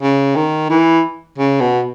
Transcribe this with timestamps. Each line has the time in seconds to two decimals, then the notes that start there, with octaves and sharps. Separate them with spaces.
0.02 C#3
0.35 D#3
0.70 E3
1.38 C#3
1.60 B2